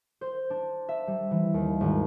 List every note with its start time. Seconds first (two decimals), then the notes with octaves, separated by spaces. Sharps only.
0.21 C5
0.50 D4
0.89 E5
1.07 G3
1.31 E3
1.54 D#2
1.81 G#1